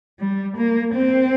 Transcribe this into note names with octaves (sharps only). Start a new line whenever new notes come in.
G3
A#3
C4